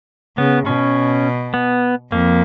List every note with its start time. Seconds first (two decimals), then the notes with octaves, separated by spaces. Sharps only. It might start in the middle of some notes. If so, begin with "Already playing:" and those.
0.37 C#3 B3
0.66 B2 C#4
1.54 B3
2.12 F2 A#3